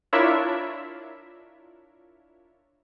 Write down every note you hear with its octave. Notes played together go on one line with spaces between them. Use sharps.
D4 E4 F4 A#4 C#5 E5